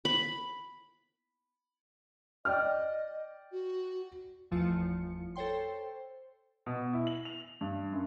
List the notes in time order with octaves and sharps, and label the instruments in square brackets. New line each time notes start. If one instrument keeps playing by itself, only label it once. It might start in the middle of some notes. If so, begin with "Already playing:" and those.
[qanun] B5
[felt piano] D5 G5 F6 [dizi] D#5
[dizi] F#4
[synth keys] G1 E2 F3 A3 F4 C#7
A4 C5 C#5 G5 C6
[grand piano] B2
E4
F#7
F7
G2
F#2